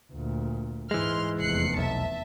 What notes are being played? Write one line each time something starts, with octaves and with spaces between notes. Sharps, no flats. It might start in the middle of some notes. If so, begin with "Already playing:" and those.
D2 A#2
G#2 E3 G#3 C6 F6
F1 E2 F#6 C7 C#7
B1 E5 A5